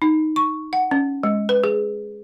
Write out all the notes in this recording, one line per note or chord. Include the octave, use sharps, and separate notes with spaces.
D#4
C#6
F#5
C#4
G#3
B4
G#4